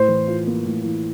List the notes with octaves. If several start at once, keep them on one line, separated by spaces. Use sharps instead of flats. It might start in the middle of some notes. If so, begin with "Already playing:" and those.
Already playing: A2 C5
E3
F4
A#3
A2
E3